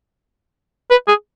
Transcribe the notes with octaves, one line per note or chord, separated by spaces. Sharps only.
B4
G#4